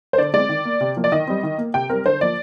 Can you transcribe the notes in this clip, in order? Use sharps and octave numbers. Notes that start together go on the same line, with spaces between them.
C5
D3 D5
G#3 C4 D5
D#3
A#3
C3
F3 A#3
D5
D#3 D#5
G3 C4
D#3
A#3
C3 G5
G3 C4 A#4
D3 C5
F3 A#3 D5